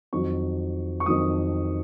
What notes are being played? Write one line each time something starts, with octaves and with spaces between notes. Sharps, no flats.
F2 D#3 F#3 C#6
C#6
F2 D#3 F#3 D#6